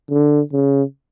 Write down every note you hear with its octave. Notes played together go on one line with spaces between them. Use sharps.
D3
C#3